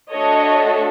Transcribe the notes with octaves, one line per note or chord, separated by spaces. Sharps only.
A3 D4 F#4 A4 C#5 D#5